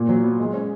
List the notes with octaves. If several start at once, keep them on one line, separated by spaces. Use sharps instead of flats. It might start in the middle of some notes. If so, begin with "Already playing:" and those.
Already playing: A#2
F#3
B3
G#3
C#4